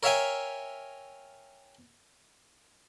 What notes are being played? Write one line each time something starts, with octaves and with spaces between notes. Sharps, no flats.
A#4 C#5 E5 F5 G5 G#5